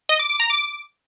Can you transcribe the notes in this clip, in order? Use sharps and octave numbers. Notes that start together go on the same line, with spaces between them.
D#5
D6
D6
A#5
D6